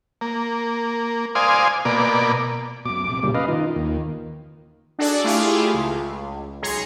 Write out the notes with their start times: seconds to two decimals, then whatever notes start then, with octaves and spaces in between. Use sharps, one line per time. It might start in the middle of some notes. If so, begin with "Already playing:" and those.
0.21 A#3
1.35 C5 D5 F5 G#5 C6 D#6
1.85 B2 A#3 D5
2.85 F#2 B2 D6
3.06 A#1 C3
3.23 C#2 F#2 A#2 C#3 G3 A#3
3.35 C#4 B4 D#5 F5
3.48 D#3 D#4 F4
3.76 D#2
4.99 D4 F#4 G#4 A4 D5
5.24 A3 E4 F4 G4 G#4 F5
5.74 C#2
6.62 B1 G#4 C#5 A#5 C6 C#6